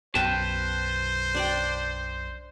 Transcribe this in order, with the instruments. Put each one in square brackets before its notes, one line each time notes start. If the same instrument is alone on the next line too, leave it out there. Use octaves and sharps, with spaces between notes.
[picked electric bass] B1 F#2 B2 [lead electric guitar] B4 A5 [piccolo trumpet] C5 [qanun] F5 G5
[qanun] D4 D5 G5